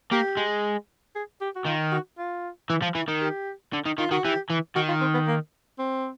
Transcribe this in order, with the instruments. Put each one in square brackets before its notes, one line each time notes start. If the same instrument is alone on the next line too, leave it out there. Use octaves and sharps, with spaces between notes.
[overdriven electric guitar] A#3 [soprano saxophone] G4
[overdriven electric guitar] G#3
[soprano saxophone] G#4
G4
F#4
[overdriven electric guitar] D#3 [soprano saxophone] F4
[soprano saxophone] F#4
F4
[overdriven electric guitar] E3
F3
E3
D#3
[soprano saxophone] G4
[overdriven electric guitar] D3
D#3
[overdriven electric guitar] D#3 [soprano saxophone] F4
[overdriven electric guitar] D#3 [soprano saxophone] F#4
[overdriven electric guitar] E3 [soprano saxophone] G4
[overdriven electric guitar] E3
[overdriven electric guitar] D#3 [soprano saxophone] F#4
[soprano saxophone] F4
C4
B3
A#3
C4